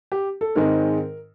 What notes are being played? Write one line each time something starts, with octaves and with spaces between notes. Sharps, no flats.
G4
A4
G#2 D#3 G#3 C4 A#4